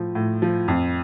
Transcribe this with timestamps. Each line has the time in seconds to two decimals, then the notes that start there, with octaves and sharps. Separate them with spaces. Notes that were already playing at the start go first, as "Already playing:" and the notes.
Already playing: A2 F3
0.15 A2
0.42 F3
0.68 F2